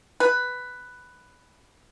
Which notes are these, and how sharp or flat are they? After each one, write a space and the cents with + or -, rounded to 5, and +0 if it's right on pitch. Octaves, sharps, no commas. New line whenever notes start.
B4 +5